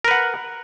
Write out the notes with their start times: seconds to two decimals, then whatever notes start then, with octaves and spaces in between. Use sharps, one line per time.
0.05 A#4
0.08 B4
0.11 F#5